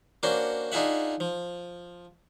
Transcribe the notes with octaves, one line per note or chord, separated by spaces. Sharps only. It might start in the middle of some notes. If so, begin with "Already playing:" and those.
A#3 C#4 D4 F#4 C5
D4 D#4 F4 G#4 E5 F#5
F3